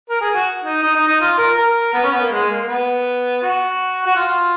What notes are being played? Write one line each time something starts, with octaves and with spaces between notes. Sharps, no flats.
A#4
G#4
F#4
D#4
D#4
D#4
D#4
F4
A#4
A#4
B3
C#4
B3
A#3
G#3
A#3
B3
F#4
F#4
F4